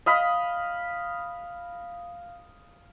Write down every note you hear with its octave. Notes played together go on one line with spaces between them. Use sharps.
D#5 F5 B5